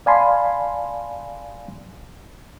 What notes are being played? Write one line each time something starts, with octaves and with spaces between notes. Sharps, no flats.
D5 F5 G#5 A5 B5 C6